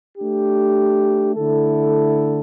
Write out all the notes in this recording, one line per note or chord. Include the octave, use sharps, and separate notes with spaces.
A3 D4 G4
D3 A3 E4 A4